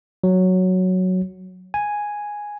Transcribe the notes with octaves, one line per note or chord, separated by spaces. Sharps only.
F#3
G#5